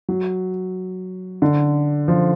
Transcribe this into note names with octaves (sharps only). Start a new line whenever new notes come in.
F#3
D3
F3